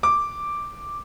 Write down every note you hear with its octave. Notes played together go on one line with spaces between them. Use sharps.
D6